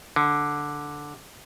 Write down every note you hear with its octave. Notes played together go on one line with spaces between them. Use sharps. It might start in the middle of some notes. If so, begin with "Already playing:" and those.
D3